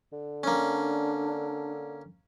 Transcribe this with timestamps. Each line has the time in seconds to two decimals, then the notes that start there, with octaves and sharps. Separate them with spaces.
0.13 D3
0.44 A#3 C#4 D4